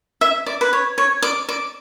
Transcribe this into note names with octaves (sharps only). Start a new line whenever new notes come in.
E5
D5
B4
C#5
C#5
D5
D5